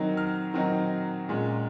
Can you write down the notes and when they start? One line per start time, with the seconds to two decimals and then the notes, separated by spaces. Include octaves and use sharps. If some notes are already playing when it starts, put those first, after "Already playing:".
Already playing: D#3 F#3 C4 D#4
0.17 F6
0.54 D#3 F#3 C4 D#4
1.29 A#2 G#3 C#4